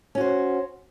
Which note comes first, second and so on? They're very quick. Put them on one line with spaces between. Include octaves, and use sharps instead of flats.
C#4 F#4 C5